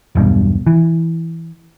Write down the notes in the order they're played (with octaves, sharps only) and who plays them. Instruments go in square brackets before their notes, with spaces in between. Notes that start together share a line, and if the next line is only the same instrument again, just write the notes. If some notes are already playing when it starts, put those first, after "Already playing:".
[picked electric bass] E1 B1 G2 B2
E3